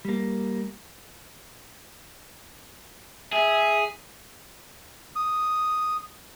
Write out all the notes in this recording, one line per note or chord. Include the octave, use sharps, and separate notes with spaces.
G3 A#3
G#4 E5
D#6